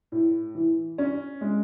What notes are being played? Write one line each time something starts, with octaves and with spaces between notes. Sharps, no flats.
A2
E3
C#4
G#3